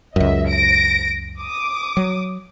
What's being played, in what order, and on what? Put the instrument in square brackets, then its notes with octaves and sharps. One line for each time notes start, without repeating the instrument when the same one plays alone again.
[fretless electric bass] C#2 F#2 [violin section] D#5 E5
[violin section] A#6 D7
D6 D#6
[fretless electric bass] F#3